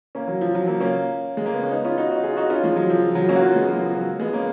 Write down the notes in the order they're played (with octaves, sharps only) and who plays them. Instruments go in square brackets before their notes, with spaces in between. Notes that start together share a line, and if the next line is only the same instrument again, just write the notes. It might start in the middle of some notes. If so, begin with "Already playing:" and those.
[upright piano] A#3 C#4
F#3
F3
F#3
F#3 A#3
A#3 C#4
G#3
A#3
B3
C#4
B3 D#4
C#4 F4
D#4 F#4
D#4 F#4
F4 G#4
D#4 F#4
C#4 F4
F3 G#3
F#3
F3
F#3
A#3 C#4
F#4
C#4 F4
G#3 B3
F#3 A#3
F3 G#3
F#3
G#3 B3
A#3 C#4